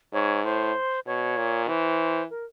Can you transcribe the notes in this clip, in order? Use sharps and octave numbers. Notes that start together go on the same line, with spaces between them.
G#2 C#5
A2 C5
B2 C#5
A#2
E3 C5
A#4